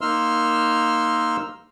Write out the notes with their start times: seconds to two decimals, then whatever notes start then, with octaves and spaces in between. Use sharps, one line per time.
0.01 A#3 D#4 C6 E6 F6